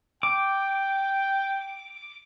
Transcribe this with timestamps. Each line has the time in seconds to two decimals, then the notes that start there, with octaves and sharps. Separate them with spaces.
0.23 G5 D6